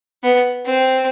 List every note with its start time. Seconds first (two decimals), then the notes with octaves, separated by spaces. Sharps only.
0.23 B3
0.66 C4